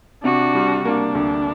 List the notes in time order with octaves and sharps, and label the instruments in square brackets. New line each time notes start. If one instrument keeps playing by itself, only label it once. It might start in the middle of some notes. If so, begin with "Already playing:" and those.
[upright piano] C3 [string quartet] D4 F#4
[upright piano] G3
[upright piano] A#3 [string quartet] D4
[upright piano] D2